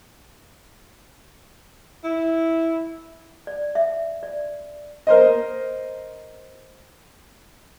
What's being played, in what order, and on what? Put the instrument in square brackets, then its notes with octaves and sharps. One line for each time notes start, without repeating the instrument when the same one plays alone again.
[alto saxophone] E4
[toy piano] D5
E5
D5
[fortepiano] A#4 C5 D#5